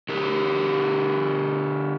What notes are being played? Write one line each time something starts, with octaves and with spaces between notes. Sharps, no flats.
D3 G4 A#4